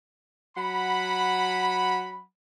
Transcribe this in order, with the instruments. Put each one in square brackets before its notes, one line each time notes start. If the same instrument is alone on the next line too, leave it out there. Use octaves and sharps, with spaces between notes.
[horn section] F#3 F#5 B5